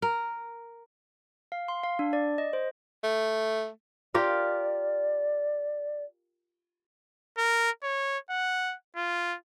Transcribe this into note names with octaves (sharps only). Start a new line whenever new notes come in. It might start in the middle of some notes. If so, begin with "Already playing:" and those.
A#4
F5
C6
F5
D4
D5
D#5
C5
A3
F4 G4 A#4 D5
A#4
C#5
F#5
F4